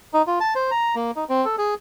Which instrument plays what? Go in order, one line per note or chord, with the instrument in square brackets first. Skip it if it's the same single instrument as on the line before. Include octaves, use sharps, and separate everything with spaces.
[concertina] D#4
F4
A5
C5
A#5
A#3
D#4
C4
A4
G#4